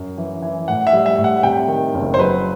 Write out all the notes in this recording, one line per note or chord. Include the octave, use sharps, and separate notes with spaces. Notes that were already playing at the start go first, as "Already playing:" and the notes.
Already playing: F#2
E3
E3
A2 F#5
E5
G3
E5
A2
F#5
C3 G5
D#3
F#1
C5
F#3 B4